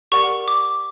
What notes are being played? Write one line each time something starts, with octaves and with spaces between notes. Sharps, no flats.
G4 A#4 D5 F#5 C#6
D6